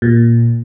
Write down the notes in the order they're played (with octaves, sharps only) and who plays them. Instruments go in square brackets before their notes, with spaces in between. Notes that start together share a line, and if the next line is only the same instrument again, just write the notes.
[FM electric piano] A#2